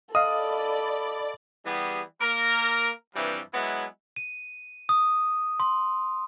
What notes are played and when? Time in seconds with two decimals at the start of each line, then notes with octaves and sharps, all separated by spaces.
0.15 A4 D5 D#5 F5 B5 D#6
1.66 E3 G3 B3 G4 G#4
2.21 A#3 A#4
3.15 G2 C3 E3 F3 G3
3.54 F#3 G#3 B3 E4
4.16 D#7
4.89 D#6
5.60 C6